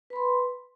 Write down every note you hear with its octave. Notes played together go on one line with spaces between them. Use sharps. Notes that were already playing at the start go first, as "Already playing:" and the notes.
B4 B5 C6